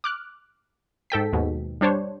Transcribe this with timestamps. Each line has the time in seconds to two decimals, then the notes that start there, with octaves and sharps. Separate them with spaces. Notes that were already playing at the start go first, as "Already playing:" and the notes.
0.04 D6 F6 F#6
1.10 G#2 A4 G5 B6
1.33 D#2 G#2 B2
1.81 G3 D4 C5 C#5